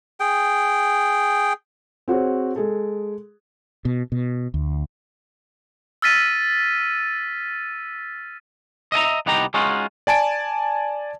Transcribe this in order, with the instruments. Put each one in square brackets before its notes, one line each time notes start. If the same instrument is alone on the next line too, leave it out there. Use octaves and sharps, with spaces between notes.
[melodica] G#4 G5
[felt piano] C4 F#4 G#4 C#5
G#3 G#4 A4
[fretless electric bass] B2
B2
D2
[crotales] E6 F6 A6 B6 D#7
[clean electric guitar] D#5 E5 A5 A#5
C2 B3 D#4 G4 A#5
G#3 C#4 D#4 F4 F#4
[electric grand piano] D5 G#5 A5 D7